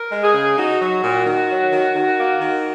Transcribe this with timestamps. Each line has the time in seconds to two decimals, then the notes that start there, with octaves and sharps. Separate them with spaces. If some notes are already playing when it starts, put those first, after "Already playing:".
Already playing: A#4
0.12 G#3
0.23 G#4
0.34 C#3
0.58 D#4 F#4
0.81 F#3
1.04 A#2
1.26 D#3
1.50 F#3
1.72 D#3
1.95 D#3
2.19 A#3
2.41 D#3